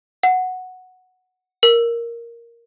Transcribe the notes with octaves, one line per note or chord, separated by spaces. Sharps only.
F#5
A#4